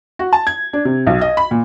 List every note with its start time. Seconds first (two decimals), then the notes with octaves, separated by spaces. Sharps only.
0.19 F#4
0.33 A5
0.47 G#6
0.73 D4
0.85 C3
1.07 B1
1.21 D#5
1.37 B5
1.51 A#2